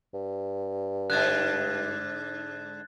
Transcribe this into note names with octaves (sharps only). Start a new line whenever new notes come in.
G2
G#2 D3 F#6 G#6 A6